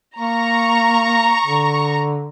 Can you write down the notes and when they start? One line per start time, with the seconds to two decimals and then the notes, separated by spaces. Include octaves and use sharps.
0.19 A#3 A#5 C#6
1.45 D3